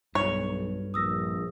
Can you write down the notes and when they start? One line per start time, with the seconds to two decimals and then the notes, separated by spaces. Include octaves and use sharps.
0.15 B1 G2 C#5
0.94 A#1 D#6 E6 A#6